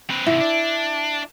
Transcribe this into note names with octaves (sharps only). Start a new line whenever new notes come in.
C4 B4
G#2 C3 E4
D4